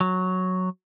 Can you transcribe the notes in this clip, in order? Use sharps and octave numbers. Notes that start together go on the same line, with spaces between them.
F#3